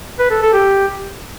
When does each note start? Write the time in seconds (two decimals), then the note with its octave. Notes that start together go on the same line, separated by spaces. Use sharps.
0.19 B4
0.31 A4
0.42 A4
0.53 G4